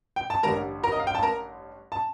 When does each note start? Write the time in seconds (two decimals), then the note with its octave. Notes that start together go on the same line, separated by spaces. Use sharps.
0.16 G5
0.30 A5
0.43 A1 G2 D3 G3 A#4 A#5
0.83 A#4 A#5
0.92 D#5
1.00 F5
1.07 G5
1.15 A5
1.23 A#4 A#5
1.92 A5